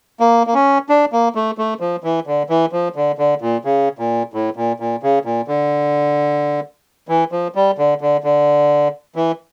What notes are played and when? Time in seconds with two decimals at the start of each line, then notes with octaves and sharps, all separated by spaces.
0.20 A#3
0.47 A#3
0.54 C#4
0.89 D4
1.13 A#3
1.35 A3
1.58 A3
1.80 F3
2.04 E3
2.27 D3
2.50 E3
2.72 F3
2.96 D3
3.19 D3
3.42 A#2
3.65 C#3
3.99 A#2
4.34 A2
4.56 A#2
4.80 A#2
5.03 C#3
5.25 A#2
5.48 D3
7.08 E3
7.32 F3
7.55 G3
7.78 D3
8.01 D3
8.24 D3
9.16 E3